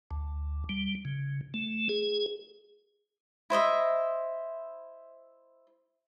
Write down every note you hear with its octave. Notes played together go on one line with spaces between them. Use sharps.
D2
G3
C#3
A3
G#4
E4 C5 D#5 E5